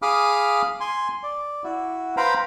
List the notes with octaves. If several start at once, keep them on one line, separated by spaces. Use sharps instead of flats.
G#4 F5 B5 D6 D#6 F6
G#5 C6
D5
E4 F#4
B4 C5 F5 G5 A#5 B5